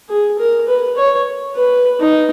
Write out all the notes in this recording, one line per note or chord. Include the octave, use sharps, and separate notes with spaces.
G#4
A#4
B4
C#5
B4
D#4